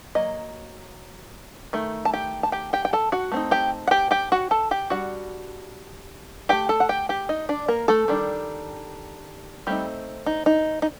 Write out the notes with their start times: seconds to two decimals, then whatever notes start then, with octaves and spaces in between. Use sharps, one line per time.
0.15 F#3 A#3 D#5
1.73 D#3 A3
2.05 A5
2.13 G4 G5
2.43 A5
2.52 G4 G5
2.73 G4 G5
2.85 G5
2.93 A4 A5
3.12 F#4 F#5
3.32 A3 C4 D#4
3.51 G4 G5
3.87 F#5
3.91 G4 G5
4.11 G4 G5
4.32 F#4 F#5
4.51 A4 A5
4.71 G4 G5
4.90 G3 D4 F#4 F#5
6.49 A3 D#4 G4 G5
6.69 A4 A5
6.80 F#5
6.89 G4 G5
7.09 G4 G5
7.29 D#4 D#5
7.49 D4 D5
7.68 A#3 A#4
7.88 A3 A4
8.08 D#3 G3 D4
9.67 G3 A3 C4 D#4 G4
10.26 D#4
10.46 D#4
10.82 D#4